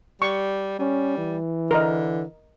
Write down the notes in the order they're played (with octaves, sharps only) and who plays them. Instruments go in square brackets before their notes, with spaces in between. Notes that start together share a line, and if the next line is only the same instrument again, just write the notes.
[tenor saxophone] G3 [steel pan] C#6
[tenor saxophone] G3 [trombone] C#4
[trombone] E3
[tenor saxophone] D3 [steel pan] A#4 D#5